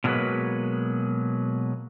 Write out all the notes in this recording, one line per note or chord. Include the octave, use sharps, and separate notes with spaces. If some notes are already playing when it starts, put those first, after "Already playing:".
B2 E3 F#3 G#3 A#3 B4